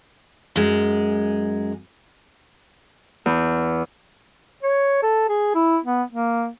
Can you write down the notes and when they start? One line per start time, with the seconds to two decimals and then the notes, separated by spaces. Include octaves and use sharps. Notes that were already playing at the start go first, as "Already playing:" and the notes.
0.56 F#2 G#3
3.26 E2
4.63 C#5
5.03 A4
5.29 G#4
5.55 E4
5.85 B3
6.13 A#3